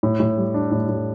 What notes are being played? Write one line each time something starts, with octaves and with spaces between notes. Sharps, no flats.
A2
A2
G3
D4
A2
A2